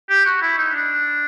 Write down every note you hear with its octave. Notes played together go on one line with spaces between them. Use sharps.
G4
F#4
E4
D#4
D4